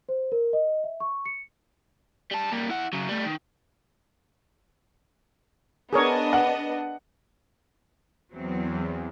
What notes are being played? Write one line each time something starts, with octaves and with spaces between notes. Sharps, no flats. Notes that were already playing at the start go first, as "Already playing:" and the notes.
C5
A#4
D#5
E5
C#6
C#7
G3 A5
G3 A#3
E4 F#5
C#3 F#3
G3 A3
D#3
B3 D4 G#4 A#4 C#5 D#5
F#5
E2 F#3 C4